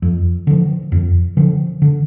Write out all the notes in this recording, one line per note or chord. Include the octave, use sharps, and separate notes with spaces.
F2
D3 F3
F2
D3 F3
D3